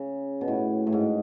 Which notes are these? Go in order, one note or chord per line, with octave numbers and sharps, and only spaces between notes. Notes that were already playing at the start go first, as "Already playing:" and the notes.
Already playing: C#3
B2
A2
A2
G#2